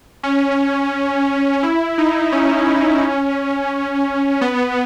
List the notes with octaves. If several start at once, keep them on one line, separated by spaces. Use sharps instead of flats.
C#4
E4
D#4
C#4
B3